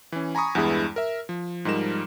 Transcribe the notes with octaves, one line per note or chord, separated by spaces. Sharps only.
E3 C#4
G#5 A#5 B5 C#6 D#6
E2 G2 E3 G#3 E4 G#4
A#4 E5
F3
G#2 F3 G3 D#4 A#4 E7